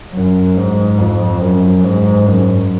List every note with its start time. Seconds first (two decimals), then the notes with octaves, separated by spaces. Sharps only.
0.15 F#2
0.57 G#2
0.99 F2
1.42 F#2
1.84 G#2
2.27 F#2